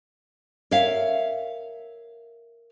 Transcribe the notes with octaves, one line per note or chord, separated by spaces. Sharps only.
A#4 C#5 E5 F5